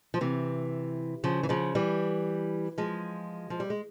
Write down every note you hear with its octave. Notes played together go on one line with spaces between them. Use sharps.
F3
C3 E3
C#3 F3
E3
C#3 F3
E3 G3
F3 G#3
F3
G3
G#3